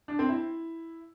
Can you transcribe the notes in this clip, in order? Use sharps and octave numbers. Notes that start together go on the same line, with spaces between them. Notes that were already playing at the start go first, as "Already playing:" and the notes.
D4
C4
E4